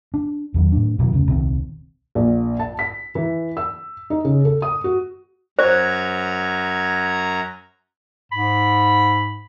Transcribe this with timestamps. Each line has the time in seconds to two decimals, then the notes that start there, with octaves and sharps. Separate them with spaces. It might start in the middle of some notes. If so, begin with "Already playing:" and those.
0.14 D4
0.54 E2 D#3 F#3
0.72 A2 D4
0.99 B2 D#3 E3 F#3
1.12 F1 D2 C#3
1.28 D#1 C2 D#3 C4
2.15 A#1
2.59 A5
2.79 B6
3.15 E3
3.57 E6
4.10 D#4
4.25 C#3
4.45 A4
4.62 D#6
4.84 F#4
5.59 F#2 C5 A#5 G#6
8.32 G#2 B5